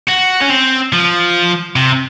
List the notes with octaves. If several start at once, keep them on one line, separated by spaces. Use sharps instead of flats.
F#4
C#4
C4
F3
C3